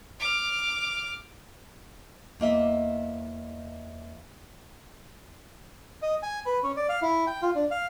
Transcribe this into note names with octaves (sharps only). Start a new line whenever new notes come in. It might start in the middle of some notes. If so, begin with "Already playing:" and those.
D6 F6
E2 A#3 D#5 E5
D#5
G#5
B4
C#4
D5
F5
E4
G5
F4
D4
F5